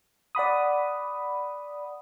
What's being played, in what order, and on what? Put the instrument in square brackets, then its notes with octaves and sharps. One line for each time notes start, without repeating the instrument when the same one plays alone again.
[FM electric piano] D5 F#5 B5 D#6